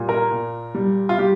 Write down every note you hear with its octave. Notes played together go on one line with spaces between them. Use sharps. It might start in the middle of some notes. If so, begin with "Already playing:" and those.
Already playing: A#2 G3
A#4
A#2
G3
F4
G3 G4